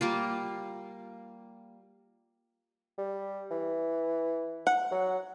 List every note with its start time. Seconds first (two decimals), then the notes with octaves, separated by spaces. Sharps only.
0.01 G3 A#3 F4
2.98 G3
3.51 E3
4.67 F#5
4.91 F#3